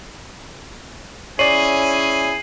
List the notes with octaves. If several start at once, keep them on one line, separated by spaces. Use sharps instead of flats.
C#4 E4 G#4 C#5 D5 C7 D#7 F#7